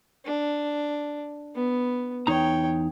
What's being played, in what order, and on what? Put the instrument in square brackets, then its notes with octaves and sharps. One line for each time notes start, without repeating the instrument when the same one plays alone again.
[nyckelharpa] D4
B3
[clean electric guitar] E2 D#4 A#5 [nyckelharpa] C#5 G5